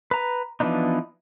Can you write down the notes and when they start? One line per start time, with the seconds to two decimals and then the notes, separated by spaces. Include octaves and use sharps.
0.11 B4 A#5
0.60 E3 F3 B3 D4 D#4